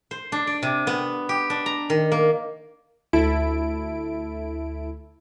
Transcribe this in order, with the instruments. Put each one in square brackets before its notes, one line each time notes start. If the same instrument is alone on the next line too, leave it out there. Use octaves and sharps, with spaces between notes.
[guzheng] C5
D4
D5
C3
B3
G4
D4
A#5
D#3
A#3
[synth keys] D2 E4 A4 D7